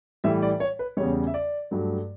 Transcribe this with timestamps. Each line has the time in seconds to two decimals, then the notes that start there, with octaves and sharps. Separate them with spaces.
0.24 A2 E3 G3 E5
0.42 D5
0.60 C#5
0.79 B4
0.97 E2 C#3 G3 C#5
1.27 E5
1.34 D5
1.71 G2 F#3 A3